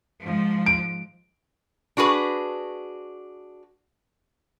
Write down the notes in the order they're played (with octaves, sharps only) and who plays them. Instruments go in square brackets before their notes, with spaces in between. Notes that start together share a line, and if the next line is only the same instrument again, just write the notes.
[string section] G#2 F3
[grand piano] D7
[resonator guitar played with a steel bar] D4 F#4 G#4 B4